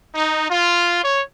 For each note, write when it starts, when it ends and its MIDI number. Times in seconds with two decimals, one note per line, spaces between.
0.15 0.45 63
0.49 1.01 65
1.02 1.21 73